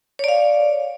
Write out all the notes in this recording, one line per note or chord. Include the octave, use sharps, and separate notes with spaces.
C#5 D5 F5